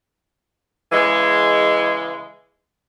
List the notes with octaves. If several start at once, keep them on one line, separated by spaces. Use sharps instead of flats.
C#3 E3 G#3